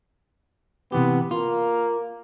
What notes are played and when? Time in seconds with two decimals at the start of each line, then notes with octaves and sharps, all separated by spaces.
0.92 C3 E3 B3 G4
1.31 A#3 F4